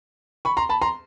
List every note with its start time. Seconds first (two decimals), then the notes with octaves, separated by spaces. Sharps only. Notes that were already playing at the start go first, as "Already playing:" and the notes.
0.45 B5 C#6
0.57 A#5 C6
0.69 A5 B5
0.82 A#5 C6